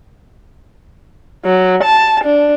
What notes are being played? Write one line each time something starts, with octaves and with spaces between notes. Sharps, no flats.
F#3
A5
D4